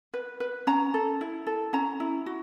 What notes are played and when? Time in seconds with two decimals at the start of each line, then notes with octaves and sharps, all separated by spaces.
0.14 B4
0.40 B4
0.67 C#4 A#5
0.94 A4
1.21 E4
1.47 A4
1.73 C#4 A#5
2.00 E4
2.26 F#4